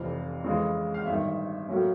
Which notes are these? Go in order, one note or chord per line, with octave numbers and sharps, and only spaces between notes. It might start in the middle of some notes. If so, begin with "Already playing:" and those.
Already playing: F1 F2 C3 E3 F5
F2 C#3 E3 G#3
F5
A1 G2 D#3 E5
A2 F#3 A#3 C#4